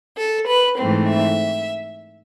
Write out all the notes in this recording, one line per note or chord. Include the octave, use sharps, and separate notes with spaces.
A4
B4
G#2 E3 A3 C4
E5